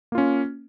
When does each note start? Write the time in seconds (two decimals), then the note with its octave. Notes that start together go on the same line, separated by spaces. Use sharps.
0.12 A#3
0.15 F4
0.18 C#4